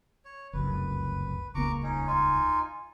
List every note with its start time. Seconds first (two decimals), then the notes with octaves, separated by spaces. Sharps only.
0.25 C#5
0.53 F1 C#2 F#2 B4
1.55 D#1 C#2 A#3 A#5 C#6 D6
1.83 C#4 D#4
2.07 D#4 F4 G#5